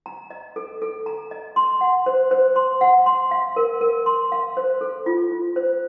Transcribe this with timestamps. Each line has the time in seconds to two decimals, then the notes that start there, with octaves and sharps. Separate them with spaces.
0.06 A#5
0.30 D#5
0.56 A4
0.82 A4
1.06 A#5
1.31 D#5
1.56 C6
1.81 F#5
2.06 C5
2.31 C5
2.56 C6
2.81 F#5
3.06 C6
3.31 F5
3.56 A#4
3.81 A#4
4.06 C6
4.32 F5
4.57 C5
4.81 A4
5.06 F4
5.32 F4
5.56 C5